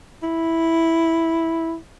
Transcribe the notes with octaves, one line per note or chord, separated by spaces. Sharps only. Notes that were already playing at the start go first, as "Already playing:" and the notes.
E4